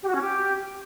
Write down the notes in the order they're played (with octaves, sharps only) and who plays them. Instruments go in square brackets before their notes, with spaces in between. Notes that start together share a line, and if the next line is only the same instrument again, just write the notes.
[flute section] G4
F#4
C#4
G4